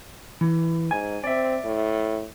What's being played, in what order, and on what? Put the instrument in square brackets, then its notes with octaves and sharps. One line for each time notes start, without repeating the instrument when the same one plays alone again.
[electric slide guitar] E3
[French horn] G#2 [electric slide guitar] G#5
[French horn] C4 [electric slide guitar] D5 E5
[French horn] A2